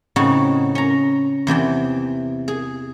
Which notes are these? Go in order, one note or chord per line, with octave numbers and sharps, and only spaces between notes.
A2 C#3 C4 D#4 F#4
C#4 A#5
E2 C3 E3 G5
G#4